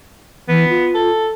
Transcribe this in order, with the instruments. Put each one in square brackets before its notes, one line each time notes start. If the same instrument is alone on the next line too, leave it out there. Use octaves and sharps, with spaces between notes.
[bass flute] E3 [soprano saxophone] B3
[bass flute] F4
[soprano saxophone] A4